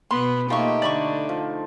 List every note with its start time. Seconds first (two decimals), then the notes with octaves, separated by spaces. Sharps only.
0.11 B2 B3 B5 C6
0.50 A3 A#3 D#4 F4 G4 C5 C#6
0.82 D3 D5 B5 C#6
1.29 F3